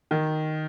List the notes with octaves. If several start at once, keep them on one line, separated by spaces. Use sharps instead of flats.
D#3